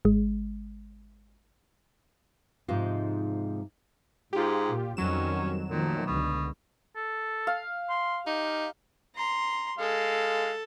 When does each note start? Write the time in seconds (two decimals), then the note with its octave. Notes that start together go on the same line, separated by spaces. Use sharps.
0.05 G#1 G#3
2.68 G#2 C3 F3 G#3 D#4 F4
4.33 G#2 F4 G4
4.68 A#2
4.97 F2 D#3 F#3 G3 C#4 E7
5.70 A#2 D#3 F3 A3
6.06 C#2 B2 D3
6.96 A4
7.47 F5
7.89 C6
8.27 D#4 G4
9.15 A#5 C6
9.78 G#3 A4 F5